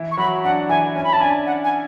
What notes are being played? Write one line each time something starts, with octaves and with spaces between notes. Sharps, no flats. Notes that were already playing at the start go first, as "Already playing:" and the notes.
Already playing: E3 E4
C#6
F#3 F#4 B5
D4 F#5
E3 E4 G#5
C#4 G#5
B5
E4 A5
D4 G#5
F#5
G#5